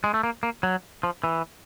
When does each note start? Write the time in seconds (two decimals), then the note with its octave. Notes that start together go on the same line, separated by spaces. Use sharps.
0.04 G#3
0.14 A3
0.23 A#3
0.43 A#3
0.63 F#3
1.03 F3
1.24 E3